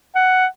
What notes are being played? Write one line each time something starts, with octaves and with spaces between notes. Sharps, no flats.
F#5